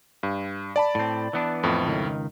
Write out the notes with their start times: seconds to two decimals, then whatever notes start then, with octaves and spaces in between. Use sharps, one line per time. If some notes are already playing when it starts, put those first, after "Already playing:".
0.23 G2
0.76 D5 A5 B5
0.95 A2 C4
1.33 E3 B3 D4
1.63 F2 A2
1.85 C#2 D#3